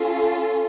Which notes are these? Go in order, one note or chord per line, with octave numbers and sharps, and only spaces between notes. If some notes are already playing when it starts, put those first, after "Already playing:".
Already playing: C#4 F4 A4